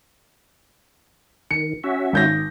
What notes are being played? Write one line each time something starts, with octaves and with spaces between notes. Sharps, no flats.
D#3 C#7
C#4 F#4 E5
G#1 G6 A#6